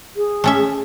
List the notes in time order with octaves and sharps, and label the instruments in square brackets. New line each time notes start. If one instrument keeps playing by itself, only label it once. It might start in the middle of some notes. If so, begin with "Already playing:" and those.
[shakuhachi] G#4
[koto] A3 C#4 E5